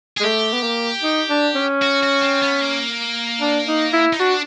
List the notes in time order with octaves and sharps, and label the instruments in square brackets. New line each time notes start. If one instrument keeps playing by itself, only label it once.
[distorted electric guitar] G#4
[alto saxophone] G#3
[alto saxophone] A3 [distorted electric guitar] G4
[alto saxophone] B3
A#3
D#4
D4
C#4
[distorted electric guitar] F#4
F#4
C4
B3
A#3
[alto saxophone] D4
D#4
E4
[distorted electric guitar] D#4
[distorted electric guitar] D4 [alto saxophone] F#4